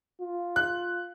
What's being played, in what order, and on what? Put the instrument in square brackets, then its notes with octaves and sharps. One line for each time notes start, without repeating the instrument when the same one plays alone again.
[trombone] F4
[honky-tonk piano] F#6